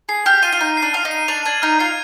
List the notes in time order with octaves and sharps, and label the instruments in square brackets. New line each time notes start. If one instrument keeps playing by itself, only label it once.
[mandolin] G#4 [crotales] C7
[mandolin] G4 [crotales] F6
[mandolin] F4 [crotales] D#7
[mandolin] F4
[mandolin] D#4 [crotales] F6
[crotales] C7
[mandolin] D4
[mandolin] F4 [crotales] F6
[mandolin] D#4
[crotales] D#7
[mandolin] D4 [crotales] F7
[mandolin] D4 [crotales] G#6
[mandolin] D#4 [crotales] F6
[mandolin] F4 [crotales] C7